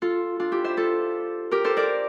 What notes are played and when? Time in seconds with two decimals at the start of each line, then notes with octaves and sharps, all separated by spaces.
0.02 F4 A4
0.40 D4 F4
0.52 E4 G4
0.64 C5 E5
0.77 F4 A4
1.51 G4 A#4
1.64 A4 C5
1.77 A#4 D5